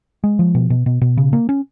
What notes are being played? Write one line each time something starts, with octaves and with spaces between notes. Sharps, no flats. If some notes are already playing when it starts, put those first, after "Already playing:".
G#3
F3
B2
B2
B2
B2
C#3
A#3
C#4